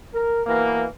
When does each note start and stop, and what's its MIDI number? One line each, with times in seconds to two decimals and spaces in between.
0.13 0.41 70
0.46 0.85 47
0.46 0.85 52
0.46 0.85 58